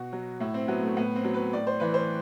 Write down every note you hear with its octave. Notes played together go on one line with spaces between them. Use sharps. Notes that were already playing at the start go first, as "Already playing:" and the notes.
Already playing: B2 F#4
F#3
A2 E4
C4
F#3 B3
A3
A2 B3
C4
F#3
B4
A2 D5
C5
E3 B4
C5